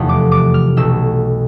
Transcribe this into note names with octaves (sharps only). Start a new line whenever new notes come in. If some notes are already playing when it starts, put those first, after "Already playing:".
Already playing: F1 E2 C3 F3 A3
D6
D6
F6
B1 B2 A3 E6